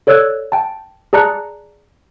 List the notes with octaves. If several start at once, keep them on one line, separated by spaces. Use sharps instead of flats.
A4 C#5 D5 E6 F#6 G#6
G5 A5
G#4 D5 A5 A#5 F#6 C#7